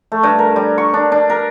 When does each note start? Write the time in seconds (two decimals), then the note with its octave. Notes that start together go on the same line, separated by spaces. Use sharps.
0.12 A3
0.23 G2
0.39 A#4
0.56 G3
0.78 C#6
0.94 D4
1.12 D4
1.30 A#4